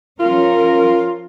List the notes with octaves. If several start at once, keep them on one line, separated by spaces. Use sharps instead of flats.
F3 C#4 F4 A#4